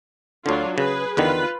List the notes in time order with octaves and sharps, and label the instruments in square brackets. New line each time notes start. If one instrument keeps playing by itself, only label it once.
[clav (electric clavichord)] D2 D3 [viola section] F#3 D4 F4
[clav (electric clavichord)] C#3 [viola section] G#4 B4
[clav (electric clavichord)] E2 D3 D#3 [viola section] F4 B4